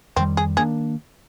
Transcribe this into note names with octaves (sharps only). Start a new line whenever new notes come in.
F2 D#3 G3 C4
G#4
D#3 A#3 D4 G#4